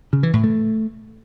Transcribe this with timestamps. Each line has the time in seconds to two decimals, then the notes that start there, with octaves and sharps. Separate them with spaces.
0.13 C#3
0.23 E3
0.33 A2
0.44 A3